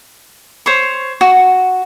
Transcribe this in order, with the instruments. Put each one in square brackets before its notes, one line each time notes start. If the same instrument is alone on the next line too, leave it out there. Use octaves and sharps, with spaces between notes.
[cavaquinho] C5 C#5 C#6
F#4